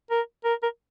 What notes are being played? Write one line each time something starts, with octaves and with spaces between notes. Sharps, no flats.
A#4
A#4
A#4